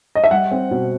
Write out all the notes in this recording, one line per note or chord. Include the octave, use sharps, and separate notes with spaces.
D#5
E5
G3 F#5
C4
B2